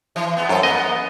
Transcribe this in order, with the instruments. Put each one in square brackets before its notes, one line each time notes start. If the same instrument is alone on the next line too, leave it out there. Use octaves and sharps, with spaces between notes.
[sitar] E3
E2 B3
[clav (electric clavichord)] F#2 [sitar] A4 C5
[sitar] A#3 B3 [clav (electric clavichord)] D#5